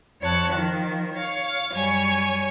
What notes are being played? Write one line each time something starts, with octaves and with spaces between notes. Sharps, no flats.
F2 C#5 A5 F#6
D#3 F3
C#5 F5
F#2 G3 C#5 G#5